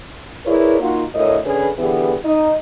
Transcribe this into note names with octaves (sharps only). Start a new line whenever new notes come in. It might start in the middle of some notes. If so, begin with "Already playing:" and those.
E4 G#4 A#4 B4 C#5 D5
A#3 D#4 F4 F#4
D2 A2 A#4 C#5 D#5
D3 C#4 G#4 B4
D3 E3 B3 G4 G#4
D#4 D#5